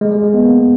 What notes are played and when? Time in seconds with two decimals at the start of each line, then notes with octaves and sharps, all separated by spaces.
0.01 G#3
0.12 G#3
0.24 G#3
0.34 B3
0.45 A#3